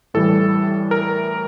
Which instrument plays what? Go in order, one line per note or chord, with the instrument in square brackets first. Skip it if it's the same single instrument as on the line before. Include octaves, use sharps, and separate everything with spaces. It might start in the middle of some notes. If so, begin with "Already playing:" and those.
[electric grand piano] A2 E3 G3 A4
A#4